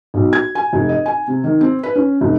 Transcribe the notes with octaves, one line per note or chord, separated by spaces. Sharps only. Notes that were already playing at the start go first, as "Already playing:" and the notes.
B1
G#6
G#5
F1
D#5
G#5
C3
D#3
C4
B4
C#4
F1